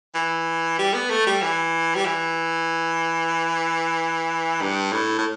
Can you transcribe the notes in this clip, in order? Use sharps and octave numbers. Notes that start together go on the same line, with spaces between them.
E3
G3
B3
A3
G3
E3
G3
E3
G2
A2
A2